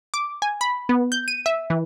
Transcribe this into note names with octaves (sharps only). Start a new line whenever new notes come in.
D6
G#5
B5
B3
G6
D#7
E5
E3